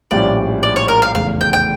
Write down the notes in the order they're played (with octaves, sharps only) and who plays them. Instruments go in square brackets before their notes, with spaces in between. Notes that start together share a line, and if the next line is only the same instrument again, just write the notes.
[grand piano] A#1 A2 G3 C#4 [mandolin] D5
[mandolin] D5
C#5
A#4
F5
[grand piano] F1 E2 C#3 [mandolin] F5
[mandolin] G5
G5